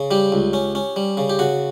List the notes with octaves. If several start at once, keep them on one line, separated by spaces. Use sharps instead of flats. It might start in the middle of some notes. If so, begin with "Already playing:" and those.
Already playing: C#3
G3 G4
C#2
C#4
C#4
G3
C#3
G4
C#3 F#4